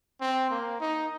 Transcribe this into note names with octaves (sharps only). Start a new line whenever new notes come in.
C4
A#3
D#4